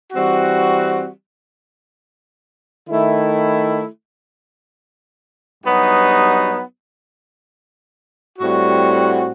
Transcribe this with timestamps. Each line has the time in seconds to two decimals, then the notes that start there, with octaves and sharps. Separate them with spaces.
0.12 E3 G3 C4 F#4
2.89 D#3 A3 E4
5.63 G2 F#3 B3 D#4 F#4
8.39 A2 G3 C4 F#4